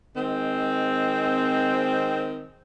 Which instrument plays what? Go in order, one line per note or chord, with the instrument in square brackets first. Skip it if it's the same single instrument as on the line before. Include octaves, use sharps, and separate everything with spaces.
[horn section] D#3 G#3 C4